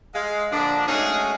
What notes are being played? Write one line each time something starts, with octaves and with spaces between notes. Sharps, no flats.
G#3 F5
A#2 D3 F3 D4
G#3 A3 C#4 D#4 F#4 G#4